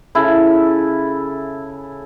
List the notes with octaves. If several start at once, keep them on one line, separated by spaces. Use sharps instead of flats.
C#3 E4 A4